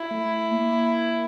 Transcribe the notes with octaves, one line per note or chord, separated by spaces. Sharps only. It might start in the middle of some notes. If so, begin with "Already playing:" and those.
Already playing: E4
A3
A#3